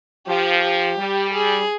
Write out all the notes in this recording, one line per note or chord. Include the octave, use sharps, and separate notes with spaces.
F3 G4
G4
G3
G#4